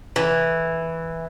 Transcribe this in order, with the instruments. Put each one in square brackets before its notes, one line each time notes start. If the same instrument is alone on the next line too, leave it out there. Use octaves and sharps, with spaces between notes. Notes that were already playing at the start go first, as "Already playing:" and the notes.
[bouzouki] E3